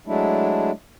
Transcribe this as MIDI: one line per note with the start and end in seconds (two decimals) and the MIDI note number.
0.07 0.71 54
0.07 0.71 56
0.07 0.71 57
0.07 0.71 62
0.07 0.71 64